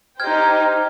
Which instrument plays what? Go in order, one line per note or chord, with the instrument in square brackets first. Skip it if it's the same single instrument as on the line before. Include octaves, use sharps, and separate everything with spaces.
[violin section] D#4 G4 C5 G5 [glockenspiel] F6 G#6